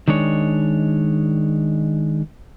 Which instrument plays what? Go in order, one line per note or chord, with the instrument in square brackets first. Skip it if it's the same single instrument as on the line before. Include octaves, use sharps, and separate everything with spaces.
[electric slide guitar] D#3 G#3 D4 C#5